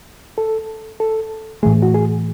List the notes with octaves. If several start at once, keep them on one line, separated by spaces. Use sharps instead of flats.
A4
A4
A2 E3 A3 G#4
F#4
G#4